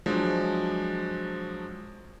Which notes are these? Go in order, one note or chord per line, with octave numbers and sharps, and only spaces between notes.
F3 F#3 G#3 D4